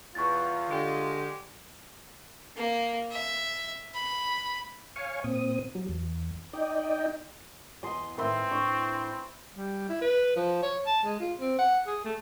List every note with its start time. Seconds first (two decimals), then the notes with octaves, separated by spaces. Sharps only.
0.15 E2 F4 C#6 A6
0.70 D3 G#3 G4
2.57 A#3
3.11 E5
3.94 B5
4.96 C#5 F5 G#5 C#6
5.24 A#2 C4 D#6
5.75 F#3
5.89 E2
6.53 D#4 D5 D#5 G5
7.83 E2 G#2 D#5 G#5 C6
8.18 A2 D#3 C4 B4 E5 C6
8.51 A2 D4 C#6
9.56 G3
9.89 E4
10.01 B4
10.36 F3
10.63 C#5
10.86 A5
11.04 G#3
11.20 F4
11.40 C4
11.58 F#5
11.87 G#4
12.05 A3